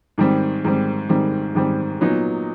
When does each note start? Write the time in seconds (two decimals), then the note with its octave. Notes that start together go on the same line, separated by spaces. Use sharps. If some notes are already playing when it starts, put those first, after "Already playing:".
0.18 G#2 D#3 G3 C4
0.64 G#2 D#3 G3 C4
1.09 G#2 D#3 G3 C4
1.55 G#2 D#3 G3 C4
2.01 A#2 F#3 B3 D#4